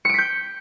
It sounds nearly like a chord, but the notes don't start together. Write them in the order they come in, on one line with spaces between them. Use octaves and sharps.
C#7 D7 B6 G6